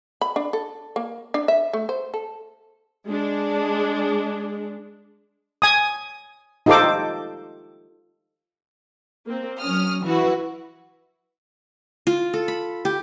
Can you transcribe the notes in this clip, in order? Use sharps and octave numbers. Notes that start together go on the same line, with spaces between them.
B5
D4
A4
A#3
D4
E5
A3
C5
A4
G#3 D4
G#5 D#6
D#4 F4 G4 A4 C5 D6
A#3 C4
F#3 C#4 D#6 F6
E3 E4 F#4 B4
F4
A4
B5
G4